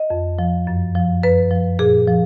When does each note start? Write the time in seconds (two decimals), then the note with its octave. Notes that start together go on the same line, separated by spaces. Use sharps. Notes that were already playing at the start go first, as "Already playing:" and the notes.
Already playing: D#5
0.10 F2
0.39 F3
0.67 F#2
0.95 F3
1.23 F#2 B4
1.51 F3
1.79 A#2 G#4
2.08 F3